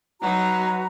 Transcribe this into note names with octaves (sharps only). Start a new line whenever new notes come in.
F#3 D#4 F#4 B4 A#5